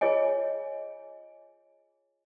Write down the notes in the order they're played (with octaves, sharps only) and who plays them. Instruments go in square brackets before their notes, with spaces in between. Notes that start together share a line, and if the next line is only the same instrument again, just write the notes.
[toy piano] F4 G#4 C#5 D#5 G#5